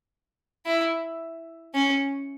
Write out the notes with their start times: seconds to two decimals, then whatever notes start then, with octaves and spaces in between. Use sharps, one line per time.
0.66 E4
1.74 C#4